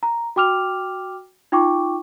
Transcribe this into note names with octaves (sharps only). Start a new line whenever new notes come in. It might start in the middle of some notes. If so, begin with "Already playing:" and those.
A#5
F#4 G5 D6 F6 F7
D#4 F4 G5 C#6 D6